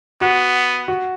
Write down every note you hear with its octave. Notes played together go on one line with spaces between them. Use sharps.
B3 F#4
F#4